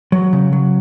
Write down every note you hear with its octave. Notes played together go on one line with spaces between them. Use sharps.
F#3
C#3
F#3